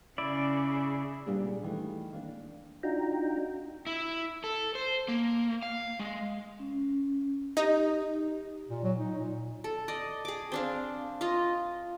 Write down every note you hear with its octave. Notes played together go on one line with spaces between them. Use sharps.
C#3 E4 D5
A#2 G3 A#3 B3 D4 G#4
D#3 E3 A3
A#3 D4
D4 D#4 F4 F#4 G5 A#5
E4
A4
C5
A#3
F5
G#3
C#4
D#4 G4
A#2
F#3
D#4
A#2
A4
D5 D#5
G#4 D6
C4 D4 F5
F4 D#5 F5